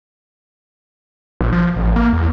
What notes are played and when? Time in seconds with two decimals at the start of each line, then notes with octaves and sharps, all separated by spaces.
1.41 A#1
1.52 F3
1.76 A1
1.96 A#3
2.13 E2